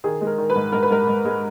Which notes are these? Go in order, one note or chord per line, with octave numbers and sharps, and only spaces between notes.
D#3 G#4
G#3
A#4
D#3
B4
G#2
G#2 A#4
B4
G#2 A#4
G#2
G#3